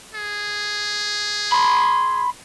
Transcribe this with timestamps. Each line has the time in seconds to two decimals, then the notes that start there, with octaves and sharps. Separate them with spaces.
0.15 G#4
1.52 B5 C6